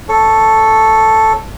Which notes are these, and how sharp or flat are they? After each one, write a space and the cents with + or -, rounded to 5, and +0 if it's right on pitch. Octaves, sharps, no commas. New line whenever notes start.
A4 +0 C#5 +0